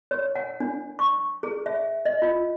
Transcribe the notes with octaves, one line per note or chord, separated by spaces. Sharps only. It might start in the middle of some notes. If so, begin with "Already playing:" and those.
C#5
F#5
D4
C#6
G#4
E5
D#5
F4